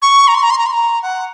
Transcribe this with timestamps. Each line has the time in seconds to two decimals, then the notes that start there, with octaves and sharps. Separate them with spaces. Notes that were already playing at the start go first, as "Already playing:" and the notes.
0.02 C#6
0.28 A#5
0.35 C6
0.43 A#5
0.50 C6
0.59 A#5
0.66 C6
0.73 A#5
1.03 F#5